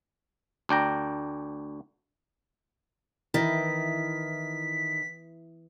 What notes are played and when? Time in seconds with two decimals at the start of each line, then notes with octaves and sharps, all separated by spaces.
0.69 D2 D4 G5 A#5
3.34 D#3 E3 E4 B6